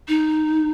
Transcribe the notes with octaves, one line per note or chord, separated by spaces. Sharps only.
D#4